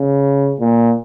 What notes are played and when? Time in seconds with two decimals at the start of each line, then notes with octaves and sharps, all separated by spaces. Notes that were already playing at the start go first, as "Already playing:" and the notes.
Already playing: C#3
0.60 A#2